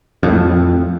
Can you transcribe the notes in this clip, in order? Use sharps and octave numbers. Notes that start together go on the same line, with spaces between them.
F2
A2
F2